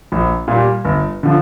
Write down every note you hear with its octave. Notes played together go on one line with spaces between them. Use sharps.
A#1
A#2 G3
G1
D3 F3